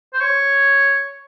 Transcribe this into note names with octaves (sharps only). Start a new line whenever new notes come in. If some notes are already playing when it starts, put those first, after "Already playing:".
C5
C#5